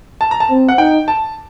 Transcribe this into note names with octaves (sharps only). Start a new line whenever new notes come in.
A5
A#5
A5
C4
F#5
D#4 G5
A5